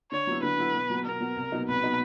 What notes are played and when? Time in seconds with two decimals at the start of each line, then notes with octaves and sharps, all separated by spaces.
0.11 D3 C#5
0.27 F#3 B3 E4
0.43 D3 B4
0.58 F#3 B3 E4
0.73 B2
0.90 F#3 B3
1.05 B2 A#4
1.20 F#3 B3
1.36 C2
1.52 B2 F#3 B3 D#4
1.68 C2 B4
1.83 B2 F#3 B3 D#4